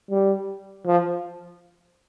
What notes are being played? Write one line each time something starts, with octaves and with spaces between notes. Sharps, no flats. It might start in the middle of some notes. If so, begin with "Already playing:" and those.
G3
F3